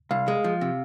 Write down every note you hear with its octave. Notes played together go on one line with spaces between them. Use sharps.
C2 F5
G#3
F3
C3